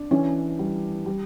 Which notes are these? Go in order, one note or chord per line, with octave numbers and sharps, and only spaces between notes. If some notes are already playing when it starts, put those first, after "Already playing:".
Already playing: D4
E3 C#4
G3
G3